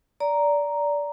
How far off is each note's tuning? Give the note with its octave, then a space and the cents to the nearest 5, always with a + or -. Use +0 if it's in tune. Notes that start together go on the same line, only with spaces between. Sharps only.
D5 -15 A#5 +0